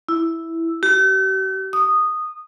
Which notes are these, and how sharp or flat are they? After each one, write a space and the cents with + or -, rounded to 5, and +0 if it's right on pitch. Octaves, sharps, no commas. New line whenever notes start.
E4 +0
G4 -45
D#6 -10